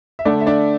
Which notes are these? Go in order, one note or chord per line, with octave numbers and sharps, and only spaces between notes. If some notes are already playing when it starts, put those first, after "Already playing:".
E5
D3 A3 D4 D5
E5
D4 D5